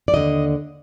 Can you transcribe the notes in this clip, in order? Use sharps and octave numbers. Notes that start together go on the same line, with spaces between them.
D5
D#2 D3 D#5